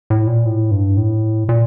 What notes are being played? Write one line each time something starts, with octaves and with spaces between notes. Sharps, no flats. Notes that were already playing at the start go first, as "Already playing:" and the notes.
A2
A#2
A2
G2
A2
A#2